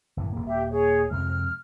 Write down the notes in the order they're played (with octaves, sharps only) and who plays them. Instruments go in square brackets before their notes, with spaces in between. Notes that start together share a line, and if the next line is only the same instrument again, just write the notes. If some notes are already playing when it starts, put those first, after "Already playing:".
[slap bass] F#1 A2 E3
D#1 A#3
[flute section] G4 E5
G#4 C#5
[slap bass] F2 C3 G#3 [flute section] F6